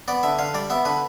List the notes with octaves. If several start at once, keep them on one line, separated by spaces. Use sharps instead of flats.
B3 D5
D3 E5
D3 F5
G3 D5
B3 E5
D3 B4